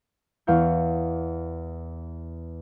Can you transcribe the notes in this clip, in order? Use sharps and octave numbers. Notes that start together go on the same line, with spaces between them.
E2 F5 C#6 G6